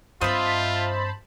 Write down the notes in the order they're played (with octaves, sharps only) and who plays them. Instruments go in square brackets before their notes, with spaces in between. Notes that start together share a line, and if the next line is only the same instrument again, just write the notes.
[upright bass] G2 C4 [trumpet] F4 [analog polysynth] C5 A5 B5 [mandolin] D#5 E5